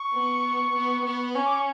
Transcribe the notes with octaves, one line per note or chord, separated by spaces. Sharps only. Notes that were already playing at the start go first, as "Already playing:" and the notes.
Already playing: C#6
B3
B3
B3
C#4 C#6
D6
C#6